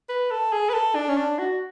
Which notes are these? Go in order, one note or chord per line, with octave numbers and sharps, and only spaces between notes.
B4
A4
G#4
B4
A4
D4
C#4
D4
F#4